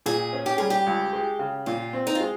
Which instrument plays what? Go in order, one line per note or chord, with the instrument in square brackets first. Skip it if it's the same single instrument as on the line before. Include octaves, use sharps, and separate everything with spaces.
[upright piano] A#2 [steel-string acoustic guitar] G#4
[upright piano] C#4
[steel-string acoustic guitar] G4
[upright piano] G3 [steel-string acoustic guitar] G#4
[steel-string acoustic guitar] G4
[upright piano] C#2
G#3
C#3
[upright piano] A#2 [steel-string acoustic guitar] F4
[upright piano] C4
[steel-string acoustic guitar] D#4
F4
[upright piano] G#3